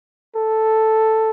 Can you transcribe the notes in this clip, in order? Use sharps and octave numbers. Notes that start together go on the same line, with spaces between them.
A4